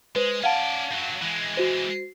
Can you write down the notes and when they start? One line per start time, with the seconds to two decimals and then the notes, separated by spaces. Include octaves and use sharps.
0.16 G#3 B4 C5
0.44 C#4 D5 F5 F#5 A5
0.91 G2 F#3
1.22 E3 G#3
1.57 F#4 C5